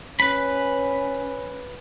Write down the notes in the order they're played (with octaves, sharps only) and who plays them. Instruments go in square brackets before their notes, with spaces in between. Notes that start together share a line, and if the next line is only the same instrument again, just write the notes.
[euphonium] C#4 [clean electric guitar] B4 B5